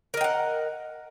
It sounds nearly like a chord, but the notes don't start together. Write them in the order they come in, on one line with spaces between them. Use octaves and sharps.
A#4 D#5 G5 F#5